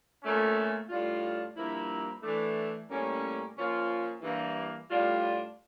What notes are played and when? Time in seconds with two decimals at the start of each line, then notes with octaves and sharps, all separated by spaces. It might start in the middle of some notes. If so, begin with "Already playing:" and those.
0.22 A#2 A3 C#4
0.89 A2 G3 D4 F4
1.55 G2 F3 A#3 E4
2.22 E3 A3 D4
2.88 A2 G3 A#3 C#4
3.55 A#2 F3 C#4 F4
4.21 G2 E3 A#3
4.87 A2 G3 D4 F4